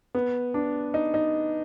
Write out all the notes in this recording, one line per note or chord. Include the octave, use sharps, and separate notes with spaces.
B3
D4
D#4
D#4